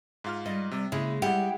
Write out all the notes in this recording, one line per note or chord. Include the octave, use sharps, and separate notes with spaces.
G#2 F4 F6
G3 D#5
C3 G3
C#3 G#3 A#3 E4
G3 G#3 E4 G4 F#5